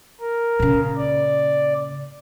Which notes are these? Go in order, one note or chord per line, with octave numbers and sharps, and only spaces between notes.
A#4
A#2 C#3
D5